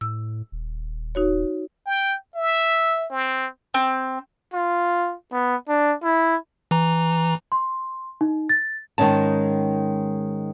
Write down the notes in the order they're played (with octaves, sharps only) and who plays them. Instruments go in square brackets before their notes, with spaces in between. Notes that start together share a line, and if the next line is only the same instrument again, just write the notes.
[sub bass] A2 [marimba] E6
[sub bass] D#1
[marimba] D#4 F#4 C#5
[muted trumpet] G5
E5
C4
[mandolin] C4
[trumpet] F4
B3
D4
E4
[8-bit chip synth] E3 A#5
[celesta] C6
D#4
A6
[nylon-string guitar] G#2 D#3 G#3 C#4 A5